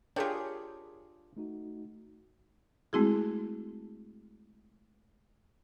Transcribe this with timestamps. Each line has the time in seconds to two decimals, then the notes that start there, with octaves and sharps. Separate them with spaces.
0.16 D4 F4 G4 G#4 A#4 C#5 G5
1.37 A3 D#4 F#4
2.93 G#3 A3 C4 E4 F#4 G#4